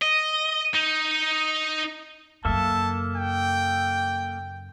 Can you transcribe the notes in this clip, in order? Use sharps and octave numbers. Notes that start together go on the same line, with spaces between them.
D#5
D#4
F#2 C#3 A#3 A4 E5 A5
G5